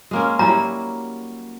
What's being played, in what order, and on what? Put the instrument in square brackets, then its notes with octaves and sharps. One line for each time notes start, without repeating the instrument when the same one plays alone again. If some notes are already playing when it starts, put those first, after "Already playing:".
[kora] G#3 A#3 C#4
[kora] F#3 G3 E4 [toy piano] A#5